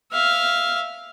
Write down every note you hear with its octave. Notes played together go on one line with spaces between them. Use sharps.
E5 F5